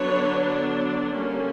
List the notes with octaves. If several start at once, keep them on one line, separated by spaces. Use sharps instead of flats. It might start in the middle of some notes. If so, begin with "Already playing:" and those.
Already playing: D3 F#3 B3 D4 B4 C#5
D3 G3 A#3 C#4